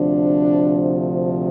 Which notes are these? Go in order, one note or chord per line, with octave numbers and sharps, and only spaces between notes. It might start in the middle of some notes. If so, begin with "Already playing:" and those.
Already playing: D2 C3 F3 D4